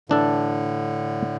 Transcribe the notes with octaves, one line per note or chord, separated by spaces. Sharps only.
A2 D3 E3 D4 A4